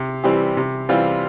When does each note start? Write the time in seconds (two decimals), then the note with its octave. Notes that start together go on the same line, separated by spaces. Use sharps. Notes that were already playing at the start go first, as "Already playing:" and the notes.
Already playing: C3
0.24 E3 G3 C4 G4
0.57 C3
0.89 E3 G3 C4 F4